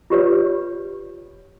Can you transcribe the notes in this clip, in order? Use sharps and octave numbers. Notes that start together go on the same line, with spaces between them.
F4 G4 B4 C#5